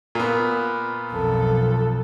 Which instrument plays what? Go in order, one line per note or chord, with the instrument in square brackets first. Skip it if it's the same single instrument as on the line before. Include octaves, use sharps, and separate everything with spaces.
[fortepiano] A#2 B3
[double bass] B1 F2 [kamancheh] A4